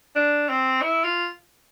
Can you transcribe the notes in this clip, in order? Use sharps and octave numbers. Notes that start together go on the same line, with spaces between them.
D4
C4
E4
F4